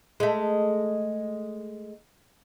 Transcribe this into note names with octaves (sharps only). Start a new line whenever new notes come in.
G#3 A3